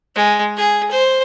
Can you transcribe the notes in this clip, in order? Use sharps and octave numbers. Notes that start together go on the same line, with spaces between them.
G#3
G#4
C5